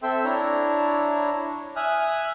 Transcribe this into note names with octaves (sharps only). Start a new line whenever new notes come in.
C4 A4 E5 G5 C6 E6
D4 E4 C#5 A#5
E5 G#5 D#6 F6 F#6